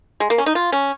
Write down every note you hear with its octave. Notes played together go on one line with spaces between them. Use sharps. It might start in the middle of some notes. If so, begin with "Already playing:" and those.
G#3
A#3
C#4
D#4
F4
C#4